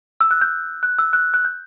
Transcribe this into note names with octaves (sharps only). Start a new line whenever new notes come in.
E6
F#6
G6
F#6
E6
F#6
F#6
G6